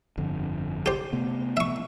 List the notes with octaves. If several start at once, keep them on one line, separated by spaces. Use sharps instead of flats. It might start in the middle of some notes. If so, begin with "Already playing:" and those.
G1 F2 D3
G4 C5
C3 A3 B3
E5 C#6